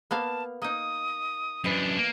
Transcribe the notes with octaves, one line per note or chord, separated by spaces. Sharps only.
A#3 B3 F5 A5
A#3 D#4 D#6
F#2 E3 D4 D#5
A#3